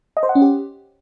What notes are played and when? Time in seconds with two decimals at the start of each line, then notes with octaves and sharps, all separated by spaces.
0.17 D#5
0.23 C5
0.29 F#5
0.35 C#4
0.42 G4